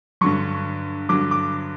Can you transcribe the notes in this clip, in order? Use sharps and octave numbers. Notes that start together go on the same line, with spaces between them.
G2 D3 F#3 C#6
G2 D3 F#3 D6
D6